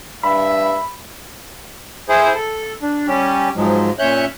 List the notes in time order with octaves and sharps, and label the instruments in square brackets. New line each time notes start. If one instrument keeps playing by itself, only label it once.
[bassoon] G2 [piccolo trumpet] E5 [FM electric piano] B5
[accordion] E4 G#4 C5
A4
D4
G3 C#4 G4
G#2 F3 F#3 G#3
A#2 C#4 C#5 E5 F#6 G6